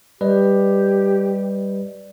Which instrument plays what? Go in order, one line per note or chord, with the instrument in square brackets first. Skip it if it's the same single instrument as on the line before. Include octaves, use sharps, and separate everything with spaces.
[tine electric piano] G3 B4 D#5 [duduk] G4 [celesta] D5